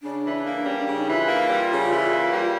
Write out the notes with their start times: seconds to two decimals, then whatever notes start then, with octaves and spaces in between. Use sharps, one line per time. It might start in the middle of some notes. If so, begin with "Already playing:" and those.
0.03 C#3 D4
0.24 E3
0.35 D4
0.45 A#3
0.65 G3 C#4
0.80 D4
0.86 C#3
0.97 D#4
1.07 E3
1.12 F4
1.27 A#3
1.49 G3
1.69 C#3
1.90 E3
2.11 A#3
2.31 G3